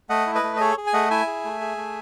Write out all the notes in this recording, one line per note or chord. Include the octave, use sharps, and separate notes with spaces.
A3 D#5 F#5
E4
B4 D#5
A3
D#5
G#4 A4 C#5
G#4
G#5
A3 D#5 F#5
E4 E5 G#5
G#4
A3
G#4
A3